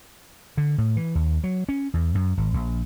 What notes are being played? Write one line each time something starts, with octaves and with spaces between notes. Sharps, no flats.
D3
A2
E3
D#2
F#3
C#4
E2
F#2
G#1
A#1